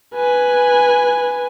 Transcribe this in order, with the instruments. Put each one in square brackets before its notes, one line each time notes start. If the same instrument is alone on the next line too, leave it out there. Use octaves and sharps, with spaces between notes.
[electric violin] B4 G#5